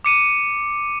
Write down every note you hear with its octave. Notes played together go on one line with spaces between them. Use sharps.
D6 C#7 D#7